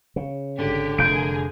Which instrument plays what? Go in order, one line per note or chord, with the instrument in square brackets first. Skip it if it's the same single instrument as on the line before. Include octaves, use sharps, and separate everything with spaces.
[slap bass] C#3
[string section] G#1 G4 [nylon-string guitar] D3
[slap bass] F1 [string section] F2 G#4 A#4 [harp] G6 D7